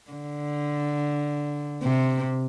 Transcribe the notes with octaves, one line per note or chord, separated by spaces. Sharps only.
D3
C3